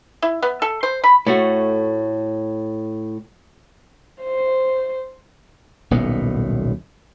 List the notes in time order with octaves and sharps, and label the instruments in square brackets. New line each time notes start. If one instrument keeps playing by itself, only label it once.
[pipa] E4
B3
A4
C5
B5
[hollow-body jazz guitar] A2 A3 F#4
[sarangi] C5
[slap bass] D#1 B1 A2 B3